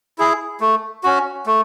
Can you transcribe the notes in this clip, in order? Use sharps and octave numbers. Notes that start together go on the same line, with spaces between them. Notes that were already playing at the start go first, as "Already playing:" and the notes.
E4 G#4
A3
C#4 F#4
A3